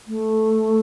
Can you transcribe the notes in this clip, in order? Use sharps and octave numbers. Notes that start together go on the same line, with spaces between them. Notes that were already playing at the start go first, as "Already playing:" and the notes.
A3